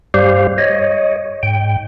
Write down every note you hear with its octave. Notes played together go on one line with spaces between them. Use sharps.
G2 G3 G4 C5 F5
C#5 D#5
G#2 G5